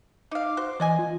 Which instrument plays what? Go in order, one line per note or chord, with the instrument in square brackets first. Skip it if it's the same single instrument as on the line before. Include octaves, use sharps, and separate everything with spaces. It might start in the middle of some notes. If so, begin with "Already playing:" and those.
[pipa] D#4 F5 [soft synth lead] D6
[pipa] F#4 C5
[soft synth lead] E3 [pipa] D5 D#5 G#5
[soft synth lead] F4